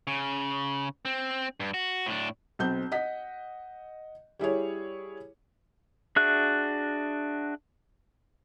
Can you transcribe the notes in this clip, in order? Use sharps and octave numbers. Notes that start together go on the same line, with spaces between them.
C#3
C4
G2
F#4
A2 D4
B1 C4 G6
D#5 F#5 B6
G3 E4 G#4 C#5
D4 F#4 G#4 E5 F#6